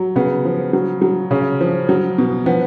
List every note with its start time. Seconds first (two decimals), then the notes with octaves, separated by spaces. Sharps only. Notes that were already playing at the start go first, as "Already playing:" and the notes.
Already playing: F#3
0.16 C#3 B3
0.45 F3
0.73 F#3
1.02 F#3
1.31 C#3 C#4
1.61 F3
1.89 F#3
2.18 B2
2.46 F3 B3